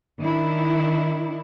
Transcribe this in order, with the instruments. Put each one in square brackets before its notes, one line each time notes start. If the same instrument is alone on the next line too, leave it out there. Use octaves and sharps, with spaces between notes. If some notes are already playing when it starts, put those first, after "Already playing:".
[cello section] D#3 D4 E4